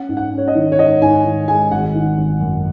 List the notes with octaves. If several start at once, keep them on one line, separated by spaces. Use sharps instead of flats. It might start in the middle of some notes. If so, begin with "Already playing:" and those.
Already playing: C#4 F#5
G#2
F#5
C#4
C#5
D#5
D#3
C#5
G#2 D#5
G#2 G#5
D#3
G#3 G#5
G#1 F#5
D#3
G#1
F#2